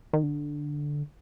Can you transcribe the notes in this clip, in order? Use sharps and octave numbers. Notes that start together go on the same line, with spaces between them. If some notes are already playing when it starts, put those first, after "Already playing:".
D#3
D3